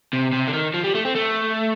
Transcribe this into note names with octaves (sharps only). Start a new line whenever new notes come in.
C3
C3
D3
D#3
F3
G3
A3
C4
A3